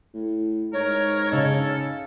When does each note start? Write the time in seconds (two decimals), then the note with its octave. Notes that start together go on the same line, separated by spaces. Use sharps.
0.14 A2
0.73 G#2 A#4 C#5
1.32 C#3 D#4 A4